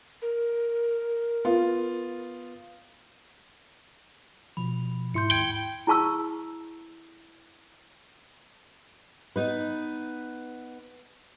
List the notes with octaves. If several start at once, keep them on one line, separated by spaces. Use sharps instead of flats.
A#4
B3 F4
B2 F3 B5
G#2 E4 C6 G6 C#7
D#2 G5 G#6
E4 G#4 A5 C#6 E6
B3 D#4 B4